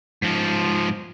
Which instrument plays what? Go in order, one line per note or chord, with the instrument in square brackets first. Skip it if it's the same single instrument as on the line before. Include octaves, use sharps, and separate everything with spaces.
[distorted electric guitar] G#2 F3